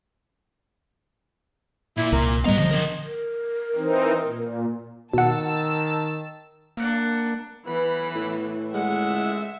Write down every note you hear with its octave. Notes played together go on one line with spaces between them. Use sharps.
A#2 E4
C2 A#4
A2 G3 B3 G4 D#5 A#5
D3 F3
D4 A#4
A#4
E3 C4 D#4
A#2
B2 D#3 F#5 A5 E6
A#3 D4 F#5
E3 B3 B5
A2
G#3 E5 F#5